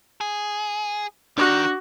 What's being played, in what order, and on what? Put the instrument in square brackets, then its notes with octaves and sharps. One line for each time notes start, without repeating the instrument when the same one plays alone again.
[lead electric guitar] G#4
[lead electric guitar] D#3 [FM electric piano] D4 D6 A#6 [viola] F#4